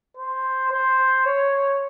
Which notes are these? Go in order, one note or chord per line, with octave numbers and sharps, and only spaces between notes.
C5
C5
C#5